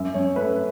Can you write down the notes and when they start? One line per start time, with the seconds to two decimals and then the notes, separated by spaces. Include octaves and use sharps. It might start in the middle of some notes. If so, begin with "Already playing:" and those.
Already playing: F#2 E5
0.14 F#2 C#5
0.36 A3 B4